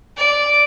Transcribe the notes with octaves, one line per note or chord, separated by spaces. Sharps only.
D5